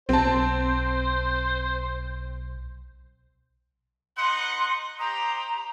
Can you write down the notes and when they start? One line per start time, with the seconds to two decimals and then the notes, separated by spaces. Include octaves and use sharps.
0.09 B1 C4 C5 A5
4.17 D#4 B4 F#5 C6
4.99 G4 C5 D#5 A#5